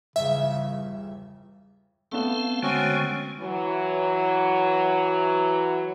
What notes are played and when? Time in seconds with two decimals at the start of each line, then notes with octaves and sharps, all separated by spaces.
0.16 G1 E2 C#3 G3 E5
2.12 A3 B3 C4 F5
2.63 D3 G#3 C4 C#4 F#4
3.40 E3 F#3